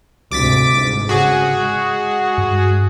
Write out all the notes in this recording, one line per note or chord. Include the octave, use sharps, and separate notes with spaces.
D2 G#2 C3 D6 A6 B6
G1 G#2
C#3 F#4 G#4
G#3
G2